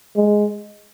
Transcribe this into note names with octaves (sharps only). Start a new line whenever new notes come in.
G#3